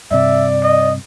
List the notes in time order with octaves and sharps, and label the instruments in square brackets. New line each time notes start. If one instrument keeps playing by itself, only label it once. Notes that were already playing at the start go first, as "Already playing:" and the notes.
[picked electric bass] G2 C3 [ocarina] D5 [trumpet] E5
[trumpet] D#5